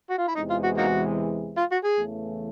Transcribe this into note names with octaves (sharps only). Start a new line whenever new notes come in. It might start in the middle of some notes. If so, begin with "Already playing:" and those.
F#4
F4
E4
E2 C3 E3 G#3 D#4
F4
F#4
A#3 D#4 F#4
F4
F#4
G#4
E2 C#3 E3 A3